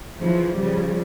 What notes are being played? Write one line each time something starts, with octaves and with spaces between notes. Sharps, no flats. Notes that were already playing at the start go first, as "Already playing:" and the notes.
C#3 E3 F3
C#3 F3 G3